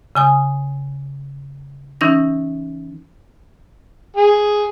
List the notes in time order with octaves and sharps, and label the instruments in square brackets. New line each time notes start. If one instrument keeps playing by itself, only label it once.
[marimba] C#3 G#5 D#6
E3 C#4 D#4 E6 A#6
[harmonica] G#4